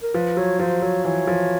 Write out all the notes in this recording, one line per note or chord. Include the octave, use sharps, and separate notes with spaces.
A#4
F3 B4
F#3 C#5
F3 C5
F#3 C#5
E3 C#5
F3